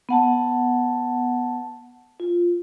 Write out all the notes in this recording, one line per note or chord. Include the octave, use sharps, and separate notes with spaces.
B3 F#5 A5
F4